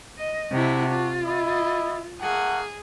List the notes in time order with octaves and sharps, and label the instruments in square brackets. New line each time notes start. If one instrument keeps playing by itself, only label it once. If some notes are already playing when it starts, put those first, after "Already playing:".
[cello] D#5
[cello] C3 E4 [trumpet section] D4 F#4
[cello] F4
[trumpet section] E4 D#5
[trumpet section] A3 A#3 F#5 [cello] G#4